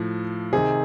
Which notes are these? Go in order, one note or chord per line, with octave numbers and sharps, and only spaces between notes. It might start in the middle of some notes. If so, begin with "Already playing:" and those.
Already playing: A2 F3
C3 D#3 G#4